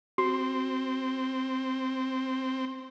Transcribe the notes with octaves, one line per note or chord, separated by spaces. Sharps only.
C4 F#4